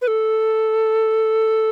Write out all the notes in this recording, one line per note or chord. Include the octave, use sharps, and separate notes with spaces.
B4
A4